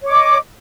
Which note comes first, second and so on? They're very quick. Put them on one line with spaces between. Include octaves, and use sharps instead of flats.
C#5 D6 D#5